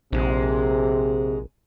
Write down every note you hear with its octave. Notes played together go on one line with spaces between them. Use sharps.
A#1 G#2 C3 G#3